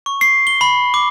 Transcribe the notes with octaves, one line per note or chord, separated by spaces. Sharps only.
C#6
C7
G7
B5
D6